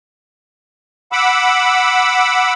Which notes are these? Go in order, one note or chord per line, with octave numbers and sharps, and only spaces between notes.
F#5 B5 D6 E6